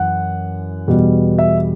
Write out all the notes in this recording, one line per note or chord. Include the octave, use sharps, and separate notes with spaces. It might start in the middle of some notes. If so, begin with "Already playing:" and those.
Already playing: F#2 E3 F#5
E2 B2 G3
E5